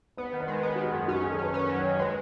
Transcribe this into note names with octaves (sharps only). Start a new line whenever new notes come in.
B3 B4
D#3
B4
G#3
B3 B4
D#3 F#4
G#4
F#2
C#4 F#4
G#4
D#3
A4
C#4 B4
C#4 B4
F#3
C#5
D#3
G#3 B4